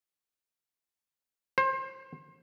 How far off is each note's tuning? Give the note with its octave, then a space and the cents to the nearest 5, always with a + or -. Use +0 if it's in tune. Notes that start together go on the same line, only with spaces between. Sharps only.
C5 +30